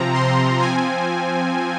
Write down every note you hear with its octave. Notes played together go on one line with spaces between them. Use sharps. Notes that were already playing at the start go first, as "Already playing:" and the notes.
Already playing: C3 F3 C4 A#5
C6
F3 C4 G#5